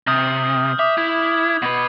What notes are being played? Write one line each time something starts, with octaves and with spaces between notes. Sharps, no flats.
C3 D#6 F6 G6
E5 D6 D#6
E4
G#6
B2 B4